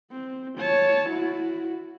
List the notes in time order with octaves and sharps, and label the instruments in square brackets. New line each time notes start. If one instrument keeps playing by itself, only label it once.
[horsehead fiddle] C4
C#5 A5
E4 F#4